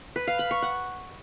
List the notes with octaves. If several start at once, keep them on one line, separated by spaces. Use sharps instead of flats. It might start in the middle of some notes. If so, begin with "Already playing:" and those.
B4
F5
B5
C#6
F#5